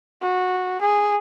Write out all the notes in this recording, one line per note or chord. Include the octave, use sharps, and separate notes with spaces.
F#4
G#4